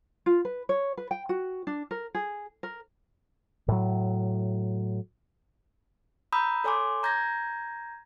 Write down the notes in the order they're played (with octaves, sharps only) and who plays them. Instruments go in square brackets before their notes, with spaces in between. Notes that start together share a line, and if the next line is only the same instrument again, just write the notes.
[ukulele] F4
B4
C#5
B4
G5
F#4
D4
A#4
G#4
A#4
[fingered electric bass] A2 F#3
[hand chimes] A#5 B5 D#6 E6 G6
A4 C#5 G#5 C6 D6
A#5 G6 G#6 A#6